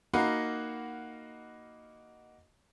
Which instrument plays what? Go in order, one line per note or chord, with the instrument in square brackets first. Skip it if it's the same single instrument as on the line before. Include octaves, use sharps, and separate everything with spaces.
[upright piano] A#3 D#4 F#4 F5 F#5 B5